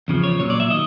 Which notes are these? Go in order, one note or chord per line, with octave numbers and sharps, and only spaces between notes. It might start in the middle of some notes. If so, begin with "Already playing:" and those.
E2 C#3 F3
C#5
B1 A#2 F#3 C#5
D5
E5
D#3 D#5